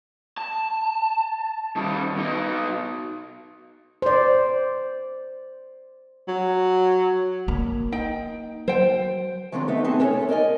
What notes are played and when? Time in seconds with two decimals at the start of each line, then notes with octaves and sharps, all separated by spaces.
0.38 A5
1.77 D#3 G3
2.16 B2 D#4
4.02 C5 D5
6.28 F#3
7.48 A#3
7.92 D#4 G5
8.68 F#3 C5 G5
9.52 D#3 F3 F#3 G#3 C4 D4
9.68 A3 B3 D#4 E5
9.84 C4 D#4 G#4 A5
10.00 B3 C#4 D4 A4 C#5
10.13 A5
10.28 A#4 D5 D#5 G#5